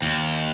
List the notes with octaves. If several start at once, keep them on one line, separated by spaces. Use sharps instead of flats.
D#2